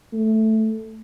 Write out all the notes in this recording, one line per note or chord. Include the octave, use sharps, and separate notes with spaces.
A3